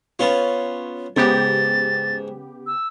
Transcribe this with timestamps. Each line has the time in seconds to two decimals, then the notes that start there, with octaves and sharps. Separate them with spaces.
0.19 B3 C#4 F4
1.16 G#2 C#3 B3 G4 A6
2.67 E6